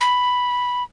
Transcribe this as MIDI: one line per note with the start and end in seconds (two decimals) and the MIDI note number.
0.01 0.83 83